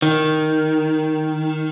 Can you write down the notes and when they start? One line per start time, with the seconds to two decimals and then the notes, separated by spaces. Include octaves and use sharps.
0.02 D#3